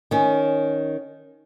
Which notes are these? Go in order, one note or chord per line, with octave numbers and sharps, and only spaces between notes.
D#3 C#4